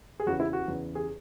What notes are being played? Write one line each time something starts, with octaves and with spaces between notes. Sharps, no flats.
G#4
E2 C#3 E3 F#4
E4
F#4
E2 C#3 E3
G#4